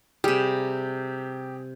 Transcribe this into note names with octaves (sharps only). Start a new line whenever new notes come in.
C3 G3 G4 G#4